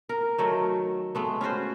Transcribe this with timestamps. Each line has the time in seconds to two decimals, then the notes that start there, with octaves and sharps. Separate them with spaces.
0.09 A#4
0.38 D#3 F#3 A3
1.15 G#3 A3 B3
1.41 C#4 F4 F#4 C5